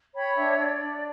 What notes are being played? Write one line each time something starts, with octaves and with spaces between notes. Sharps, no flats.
C#5 G5 B5
D4 E5 G5
D4 D5
D4